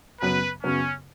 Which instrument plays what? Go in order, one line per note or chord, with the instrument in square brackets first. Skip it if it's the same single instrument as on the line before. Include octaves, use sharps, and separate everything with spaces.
[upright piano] F#2 C#3 F#3 B3 [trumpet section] B4
[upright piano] F#2 C#3 F#3 B3 [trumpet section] C#4